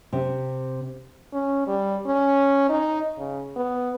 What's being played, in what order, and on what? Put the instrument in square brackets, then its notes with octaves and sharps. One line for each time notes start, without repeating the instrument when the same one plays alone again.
[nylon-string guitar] C3
[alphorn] C#4
G3
C#4
D#4
C#3
B3